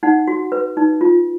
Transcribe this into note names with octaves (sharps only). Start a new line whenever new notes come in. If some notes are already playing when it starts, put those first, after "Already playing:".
D#4 F#5
F#4
B4
D#4
F4